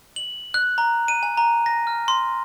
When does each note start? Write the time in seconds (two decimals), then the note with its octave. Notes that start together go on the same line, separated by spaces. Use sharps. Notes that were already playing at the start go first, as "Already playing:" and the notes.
0.16 F#7
0.54 F#6
0.78 A#5
1.08 D#7
1.23 G#5
1.37 A#5
1.66 A#6
1.87 F6
2.08 C6